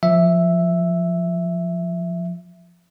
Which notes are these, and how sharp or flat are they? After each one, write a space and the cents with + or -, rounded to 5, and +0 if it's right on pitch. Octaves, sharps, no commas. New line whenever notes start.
F3 +0 E5 +0